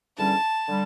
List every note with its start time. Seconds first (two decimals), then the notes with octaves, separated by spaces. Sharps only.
0.17 E2 D3 G3 C#4 A5
0.68 D3 G3